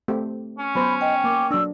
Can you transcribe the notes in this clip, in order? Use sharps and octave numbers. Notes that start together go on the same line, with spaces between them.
A3 C4 G4
C#4
F#3 B3 C5 B5
D#5 G5
A#3 D6
F#3 D4 E6